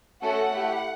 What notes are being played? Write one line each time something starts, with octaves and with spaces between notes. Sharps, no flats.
A3 C#4 F#4 A4 F#5
A3 E4 G4